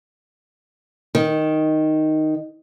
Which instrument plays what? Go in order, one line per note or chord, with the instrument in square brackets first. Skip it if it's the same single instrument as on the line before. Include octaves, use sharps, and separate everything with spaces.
[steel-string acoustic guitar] D#3